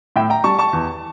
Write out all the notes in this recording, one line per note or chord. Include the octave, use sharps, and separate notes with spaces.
A2 E5 G5
G5 A#5
G3 A5 C#6
A5 C#6
E2